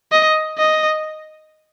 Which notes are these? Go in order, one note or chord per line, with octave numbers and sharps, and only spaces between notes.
D#5
D#5